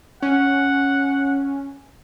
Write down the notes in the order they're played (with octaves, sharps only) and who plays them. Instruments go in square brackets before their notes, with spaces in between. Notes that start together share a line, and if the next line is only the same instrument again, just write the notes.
[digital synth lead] C#4 [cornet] F#5